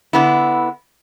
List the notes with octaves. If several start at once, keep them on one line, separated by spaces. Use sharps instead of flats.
D3 B3 E4